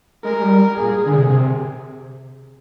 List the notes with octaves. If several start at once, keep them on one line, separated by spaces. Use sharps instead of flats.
G#3 A#4
G3
A#2 G#4
D3
C3
C3